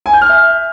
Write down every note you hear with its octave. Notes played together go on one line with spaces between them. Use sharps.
G#5
G6
F6
E5